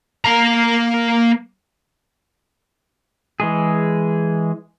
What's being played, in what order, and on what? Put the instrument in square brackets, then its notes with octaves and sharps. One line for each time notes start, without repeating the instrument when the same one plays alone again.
[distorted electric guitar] A#3 A#5
[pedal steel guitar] E3 G#3 G#4